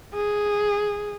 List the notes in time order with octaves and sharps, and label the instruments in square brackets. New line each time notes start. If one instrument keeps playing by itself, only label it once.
[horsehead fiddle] G#4